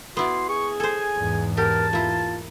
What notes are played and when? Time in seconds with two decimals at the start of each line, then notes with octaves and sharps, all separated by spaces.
0.17 B3 E4 F#4 D5 C6
0.49 G#4 C#6
0.80 A4 C5 G#5
1.17 E2 G#2
1.57 G4 A#4 A5
1.93 A#3 E4 F4